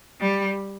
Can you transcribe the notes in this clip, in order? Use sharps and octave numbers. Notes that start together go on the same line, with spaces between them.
G3